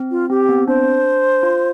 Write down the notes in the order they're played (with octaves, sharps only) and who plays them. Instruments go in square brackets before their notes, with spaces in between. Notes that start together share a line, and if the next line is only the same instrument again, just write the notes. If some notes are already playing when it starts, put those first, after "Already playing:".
Already playing: [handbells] C4
[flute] F4
[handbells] C4 [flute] G4
[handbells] B3
C4
[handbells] D4 [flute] C5
[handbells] F4